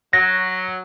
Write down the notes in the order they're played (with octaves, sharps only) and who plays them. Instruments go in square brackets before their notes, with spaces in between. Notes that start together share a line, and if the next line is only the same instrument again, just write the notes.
[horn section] F#3 [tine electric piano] A#6